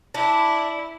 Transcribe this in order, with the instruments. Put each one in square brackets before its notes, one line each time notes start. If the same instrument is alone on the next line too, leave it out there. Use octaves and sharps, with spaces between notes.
[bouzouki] D4 [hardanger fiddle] E4